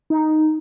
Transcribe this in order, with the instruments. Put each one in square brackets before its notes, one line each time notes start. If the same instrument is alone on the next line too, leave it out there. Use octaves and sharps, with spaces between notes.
[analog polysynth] D#4